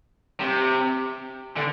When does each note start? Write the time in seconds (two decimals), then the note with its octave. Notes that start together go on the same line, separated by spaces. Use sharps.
0.40 C3
1.57 D3